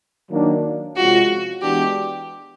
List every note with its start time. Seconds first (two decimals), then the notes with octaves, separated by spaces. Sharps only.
0.30 D#3 F#3 A#3 D4
0.96 C3 F3 G#3 C#4 F4 F#4
1.62 E3 G#3 B3 D4 F#4 G4